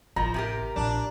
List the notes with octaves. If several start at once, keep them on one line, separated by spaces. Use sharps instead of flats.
A1 F3 A#5
C3 G4 A#4
A#1 D4